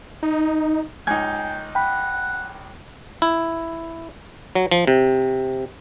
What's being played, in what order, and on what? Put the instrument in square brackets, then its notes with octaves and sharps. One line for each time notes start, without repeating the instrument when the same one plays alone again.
[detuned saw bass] D#4
[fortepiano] C#2 D#4 [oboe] G5 [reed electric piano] G#5 G#6
[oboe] F#5 [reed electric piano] G5 B5
[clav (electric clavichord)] E4
F#3
F3
C3